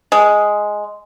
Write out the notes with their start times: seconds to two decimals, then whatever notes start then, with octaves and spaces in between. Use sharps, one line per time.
0.12 G#3